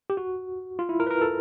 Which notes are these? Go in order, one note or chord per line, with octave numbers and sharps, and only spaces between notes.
G4
F#4
F4
E4
A#4
B4
A#4
A4